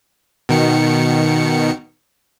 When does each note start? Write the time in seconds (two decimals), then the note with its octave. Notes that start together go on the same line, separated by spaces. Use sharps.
0.49 B2 D#3 C#7